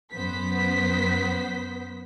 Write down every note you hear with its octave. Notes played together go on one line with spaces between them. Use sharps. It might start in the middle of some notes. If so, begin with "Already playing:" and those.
F#2 B3 C5 B6